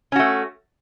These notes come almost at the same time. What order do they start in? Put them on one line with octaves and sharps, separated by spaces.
C#4 F#4 A3